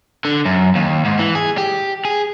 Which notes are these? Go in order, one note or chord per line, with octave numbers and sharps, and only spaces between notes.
D3
F#2
D#2
G#2
E3
G#4
G4
G#4